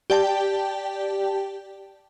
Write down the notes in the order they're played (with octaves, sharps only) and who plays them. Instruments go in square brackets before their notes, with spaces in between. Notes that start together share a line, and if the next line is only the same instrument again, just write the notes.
[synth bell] G4 D5 G5 A5